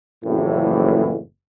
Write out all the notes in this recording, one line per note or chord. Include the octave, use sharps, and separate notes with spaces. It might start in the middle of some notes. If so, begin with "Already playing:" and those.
F#1 F2 A2 E3